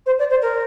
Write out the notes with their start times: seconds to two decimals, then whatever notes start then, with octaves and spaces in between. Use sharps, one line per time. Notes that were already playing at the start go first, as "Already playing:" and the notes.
0.06 C5
0.18 D5
0.30 C5
0.42 A#4